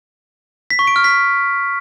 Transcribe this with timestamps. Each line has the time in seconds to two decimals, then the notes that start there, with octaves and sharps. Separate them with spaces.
0.70 B6
0.79 C#6
0.87 D7
0.96 F6
1.04 B6